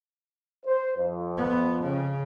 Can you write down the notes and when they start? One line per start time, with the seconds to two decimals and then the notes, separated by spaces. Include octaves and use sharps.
0.65 C5
0.97 F2
1.37 B3
1.82 C#3